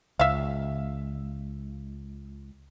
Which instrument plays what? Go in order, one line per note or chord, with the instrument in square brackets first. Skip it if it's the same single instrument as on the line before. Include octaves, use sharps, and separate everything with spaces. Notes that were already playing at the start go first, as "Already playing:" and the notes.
[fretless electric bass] C#2 [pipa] E5 F5